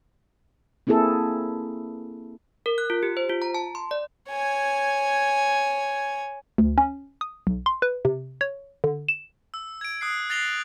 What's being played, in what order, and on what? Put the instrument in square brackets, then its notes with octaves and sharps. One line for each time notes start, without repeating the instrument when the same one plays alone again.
[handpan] A#3 C4 E4 G#4 A4
[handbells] A#4
F#6
F4
G4
C5
F4
A#5
A5
C6
D5
[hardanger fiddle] C#5 G#5
[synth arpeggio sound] D2
C#4
D#6
B1
C6
B4
C3
C#5
D3
E7
[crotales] E6
G#6 D7
D#6 F#6 C7
F#6 A6 A#6 C7 F7 G7